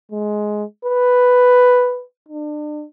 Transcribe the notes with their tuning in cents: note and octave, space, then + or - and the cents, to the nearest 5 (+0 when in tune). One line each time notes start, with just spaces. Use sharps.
G#3 +15
B4 +5
D4 +35